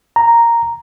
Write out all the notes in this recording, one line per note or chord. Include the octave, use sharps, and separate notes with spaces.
A#5